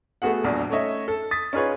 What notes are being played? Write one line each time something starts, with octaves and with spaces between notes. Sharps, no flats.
A3 B3 F#4 G#4 F#5
D#1 A#1 E2 D4 F#4
A3 C#4 D#4 C#5 D#5 E5
A4
D#6 A6 B6
C#4 D#4 F4 G#4 B4 C#5